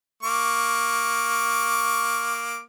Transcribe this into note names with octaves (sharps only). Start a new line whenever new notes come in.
A#3 C#6 D6